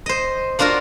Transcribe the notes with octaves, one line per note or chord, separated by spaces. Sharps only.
C5 D#5
A#3 D4 F4 F#4 A#4